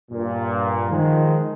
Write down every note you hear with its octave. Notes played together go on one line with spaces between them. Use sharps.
G2 A#2
D#3 F3 G#3